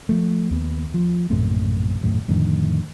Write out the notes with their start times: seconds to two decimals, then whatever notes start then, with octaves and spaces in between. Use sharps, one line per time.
0.09 F3 A3
0.50 D#2 B3
0.94 F3
1.30 A#1 F#2 A2 C3
2.01 D#1 F#2 A2
2.28 F2 A2 D3 D#3